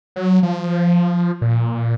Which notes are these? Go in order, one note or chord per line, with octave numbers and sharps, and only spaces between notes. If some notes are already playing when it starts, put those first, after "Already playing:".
F#3
F3
A#2